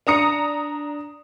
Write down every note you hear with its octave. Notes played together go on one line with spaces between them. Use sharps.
D4 A#5 D#6 C#7